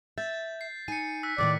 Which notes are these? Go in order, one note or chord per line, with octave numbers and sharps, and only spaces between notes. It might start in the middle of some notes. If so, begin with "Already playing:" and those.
E5 G6 A6
C7
D#4 G#5 C#7 D#7
E6 F#6 B6
D#2 A2 D#3 D5